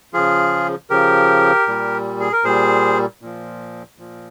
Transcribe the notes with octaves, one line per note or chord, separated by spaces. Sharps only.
C#3 F3 F4 G#4
C#3 F3 G4 A#4
A#2 G3
G#4
A#4
A#2 G3 G#4 C5
A#2 F3
A#2 F3